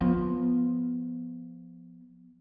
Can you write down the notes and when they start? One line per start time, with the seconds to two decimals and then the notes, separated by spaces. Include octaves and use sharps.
0.01 F3 B3